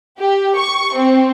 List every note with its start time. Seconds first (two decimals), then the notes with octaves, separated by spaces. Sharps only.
0.20 G4
0.56 C#6
0.94 C4